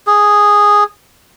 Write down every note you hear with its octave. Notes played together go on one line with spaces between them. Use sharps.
G#4